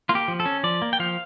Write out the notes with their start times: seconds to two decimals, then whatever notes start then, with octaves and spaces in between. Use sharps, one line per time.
0.09 A#3 F4
0.15 G4
0.28 F3
0.40 A4
0.45 C#4
0.63 F3 D5
0.82 A#3
0.93 G5
0.99 F3 F5